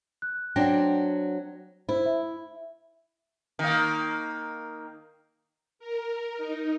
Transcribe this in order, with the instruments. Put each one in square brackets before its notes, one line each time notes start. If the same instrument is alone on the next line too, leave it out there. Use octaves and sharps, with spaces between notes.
[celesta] F#6
[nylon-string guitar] F#3 C4 D4 [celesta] F#5 A#6
[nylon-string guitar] E4 [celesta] C5
[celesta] E5
[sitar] D#3 A#3
[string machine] A#4
D#4